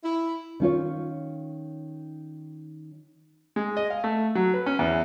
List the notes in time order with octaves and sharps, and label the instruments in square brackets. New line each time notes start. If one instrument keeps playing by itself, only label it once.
[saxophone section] E4
[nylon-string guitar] D#3 C#4 F4 C#5
[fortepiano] G#3
D#5
F5
A3
F#3
B4
C#4
E2